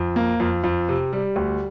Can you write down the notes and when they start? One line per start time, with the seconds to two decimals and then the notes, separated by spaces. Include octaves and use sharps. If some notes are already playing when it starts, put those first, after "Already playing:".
Already playing: F2
0.16 A#3
0.40 F2
0.64 F2
0.89 C3
1.13 G3
1.36 D2